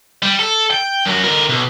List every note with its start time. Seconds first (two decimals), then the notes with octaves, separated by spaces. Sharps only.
0.22 G3
0.39 A4
0.70 G5
1.06 F#2 F#4
1.24 D3 A#4
1.50 B1